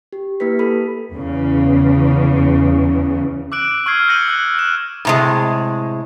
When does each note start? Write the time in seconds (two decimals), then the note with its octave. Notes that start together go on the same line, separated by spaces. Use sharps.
0.13 G4
0.40 A#3 E4 G4 B4 B6
0.59 A4 B5
1.14 E2 C#3
3.52 D6 E6 F#6 D7 F#7
3.86 C#6 E6 F6 G#6 C7
4.08 G6 G#6 A#6 C#7 D#7 F#7
4.28 E6 F#6
4.58 F#6 E7
5.05 A2 C3 G#3